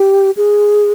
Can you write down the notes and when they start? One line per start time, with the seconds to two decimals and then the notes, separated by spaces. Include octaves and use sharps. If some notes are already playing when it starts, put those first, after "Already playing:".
Already playing: G4
0.37 G#4